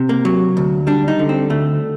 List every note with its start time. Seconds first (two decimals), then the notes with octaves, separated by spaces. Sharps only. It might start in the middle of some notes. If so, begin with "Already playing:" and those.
Already playing: C3
0.09 A#3
0.25 F#3
0.57 D2
0.87 G3 D4
1.08 D#4
1.19 D3
1.29 C4
1.50 D2 A3